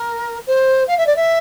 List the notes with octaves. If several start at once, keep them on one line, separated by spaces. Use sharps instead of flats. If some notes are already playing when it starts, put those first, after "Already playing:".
Already playing: A#4
C5
F5
E5
D5
E5